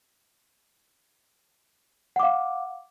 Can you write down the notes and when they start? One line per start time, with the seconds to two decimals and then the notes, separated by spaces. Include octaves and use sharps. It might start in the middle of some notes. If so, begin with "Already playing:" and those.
2.16 F#5
2.20 D6
2.23 F5